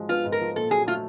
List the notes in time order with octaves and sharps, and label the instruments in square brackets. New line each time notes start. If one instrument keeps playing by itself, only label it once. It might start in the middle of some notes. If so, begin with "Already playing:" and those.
Already playing: [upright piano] G#2 F3 F#3 G#3
[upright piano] B3 [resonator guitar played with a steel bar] F4
[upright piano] G#2
[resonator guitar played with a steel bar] A#4
[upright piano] F3
[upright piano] A#2 [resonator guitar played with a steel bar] A4
[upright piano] F#3 [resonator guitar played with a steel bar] G#4
[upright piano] A3 [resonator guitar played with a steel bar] F4